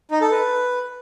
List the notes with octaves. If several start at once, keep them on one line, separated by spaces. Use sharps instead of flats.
D#4
A4
B4